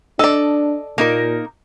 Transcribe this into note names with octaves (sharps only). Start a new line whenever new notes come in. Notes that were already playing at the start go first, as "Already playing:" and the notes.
D4 A4 D5 D#5
A#2 A#3 D#4 A#4